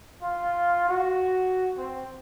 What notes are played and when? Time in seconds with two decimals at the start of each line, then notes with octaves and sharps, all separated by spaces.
0.22 F4
0.89 F#4
1.78 C4